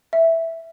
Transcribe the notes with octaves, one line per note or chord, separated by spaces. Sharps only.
E5